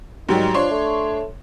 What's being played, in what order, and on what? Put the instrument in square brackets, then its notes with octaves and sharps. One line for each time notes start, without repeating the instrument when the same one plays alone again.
[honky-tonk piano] G#2 F#3 G3 [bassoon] D#3
[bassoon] F3 [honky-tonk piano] D4 C#5 C6
[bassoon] A3